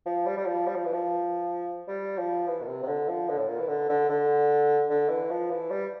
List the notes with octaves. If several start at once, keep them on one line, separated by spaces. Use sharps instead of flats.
F3
G3
G3
F3
G3
F3
E3
F3
G3
F3
E3
A#2
C3
C3
D3
F3
D3
A2
A#2
E3
D3
D3
D3
D3
E3
F3
E3
G3